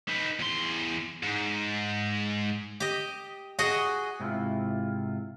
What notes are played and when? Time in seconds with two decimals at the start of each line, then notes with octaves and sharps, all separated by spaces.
0.08 D#4 B4
0.40 E2 C6
1.23 G#2
2.80 G4 D#5
3.59 F#4 G#4 D#5
4.20 G#2 C3 B3 E4 F4